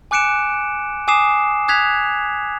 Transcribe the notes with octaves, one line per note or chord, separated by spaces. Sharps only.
G#5 D6 F#6 C#7 D7 E7
G#5 D6 D#6 C7 E7
D#6 F#6 G#6 B6 F7